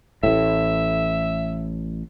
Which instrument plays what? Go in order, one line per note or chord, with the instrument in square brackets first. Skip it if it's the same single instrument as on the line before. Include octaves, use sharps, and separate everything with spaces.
[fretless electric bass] A1 A2 [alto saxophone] E5